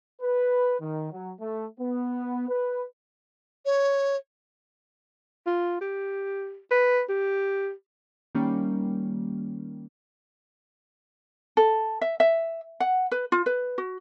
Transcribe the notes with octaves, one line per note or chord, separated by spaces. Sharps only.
B4
D#3
F#3
A3
B3
B4
C#5
F4
G4
B4
G4
D#3 G3 A#3 C#4
A4
E5
E5
F#5
B4
F4
B4
F#4